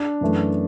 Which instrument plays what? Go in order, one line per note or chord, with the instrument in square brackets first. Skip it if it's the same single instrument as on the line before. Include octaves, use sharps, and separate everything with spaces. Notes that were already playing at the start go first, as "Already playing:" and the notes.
Already playing: [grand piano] D4
F#2 E3 A3